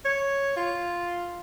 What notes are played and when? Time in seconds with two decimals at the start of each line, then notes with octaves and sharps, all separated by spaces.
0.05 C#5
0.57 F4